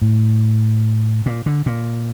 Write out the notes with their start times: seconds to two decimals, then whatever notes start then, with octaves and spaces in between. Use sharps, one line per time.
0.02 A2
1.26 A#2
1.46 D3
1.66 A#2